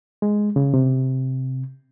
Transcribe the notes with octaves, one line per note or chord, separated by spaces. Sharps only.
G#3
C#3
C3